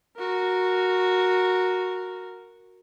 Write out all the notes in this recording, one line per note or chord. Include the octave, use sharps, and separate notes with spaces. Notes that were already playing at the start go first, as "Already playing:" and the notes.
F#4 A#4